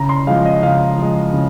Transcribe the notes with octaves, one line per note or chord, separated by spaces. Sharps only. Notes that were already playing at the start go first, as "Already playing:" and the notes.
Already playing: C#3 A#5
C6
F3 G#3 F5
D#5
C#3 F5
F3 G#3
C#3